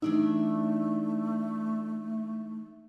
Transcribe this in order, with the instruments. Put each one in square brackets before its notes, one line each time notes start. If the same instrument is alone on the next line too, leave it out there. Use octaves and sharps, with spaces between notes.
[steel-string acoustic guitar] E3 D4 E5 [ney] A3 [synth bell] D#4